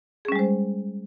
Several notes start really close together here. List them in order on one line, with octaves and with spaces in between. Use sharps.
G#4 C#4 G3 G#3 C5